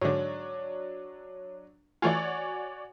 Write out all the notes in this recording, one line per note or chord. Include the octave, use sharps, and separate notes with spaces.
G#2 D3 F#3 D4 C#5
E3 A3 F4 F#4 C#5 D5 G#5